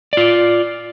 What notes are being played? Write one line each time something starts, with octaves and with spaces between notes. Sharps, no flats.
F4 D5